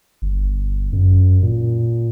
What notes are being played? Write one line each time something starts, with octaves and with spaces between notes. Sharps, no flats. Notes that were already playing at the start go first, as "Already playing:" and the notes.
G1
F#2
A#2